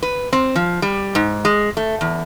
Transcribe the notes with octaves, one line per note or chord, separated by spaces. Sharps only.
B4
C4
F3
G3
G#2
G#3
A3
E2